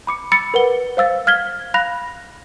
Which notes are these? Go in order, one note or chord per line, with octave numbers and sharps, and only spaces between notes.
B5 D6 C#7
B5 E6 A6 C#7
A#4 B4 F#5 G7
C5 F5 E6 A6
F5 F6 G#6 B6 G7
F5 B5 F#6 A#6 F7